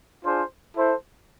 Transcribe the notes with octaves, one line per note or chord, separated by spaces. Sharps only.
D4 F4 G#4 C5
E4 A4 C5